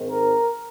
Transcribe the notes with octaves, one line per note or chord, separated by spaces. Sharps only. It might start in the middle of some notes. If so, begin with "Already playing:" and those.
Already playing: G#2 D#3 C4
A#4